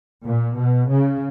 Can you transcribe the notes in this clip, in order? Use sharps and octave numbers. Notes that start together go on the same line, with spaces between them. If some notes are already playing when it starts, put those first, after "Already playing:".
A#2
B2
C#3